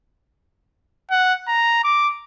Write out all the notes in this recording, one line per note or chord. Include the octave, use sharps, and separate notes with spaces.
F#5
A#5
D6